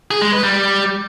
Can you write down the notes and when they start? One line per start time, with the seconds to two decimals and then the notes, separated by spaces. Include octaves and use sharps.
0.11 G#4
0.22 G#3
0.32 B4
0.43 G3